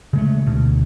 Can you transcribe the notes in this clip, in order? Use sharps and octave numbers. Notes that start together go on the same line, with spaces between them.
C#3 G#3 A3
D2 B2